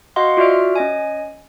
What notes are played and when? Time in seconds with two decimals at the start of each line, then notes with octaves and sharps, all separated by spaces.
0.16 F#4 D#5 F5 F#5 C6
0.37 F4 F#4 D5 E5 F6 D7
0.76 C#4 D#5 G#5